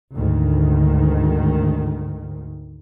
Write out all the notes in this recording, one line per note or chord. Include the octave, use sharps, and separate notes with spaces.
D2 G#2 D#3